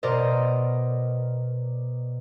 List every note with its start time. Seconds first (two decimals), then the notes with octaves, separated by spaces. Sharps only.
0.03 B2 A#4 C5 D5 D#5